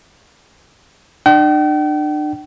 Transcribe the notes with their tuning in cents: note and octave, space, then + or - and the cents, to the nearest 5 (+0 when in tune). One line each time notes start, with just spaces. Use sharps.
D4 +35 G5 -45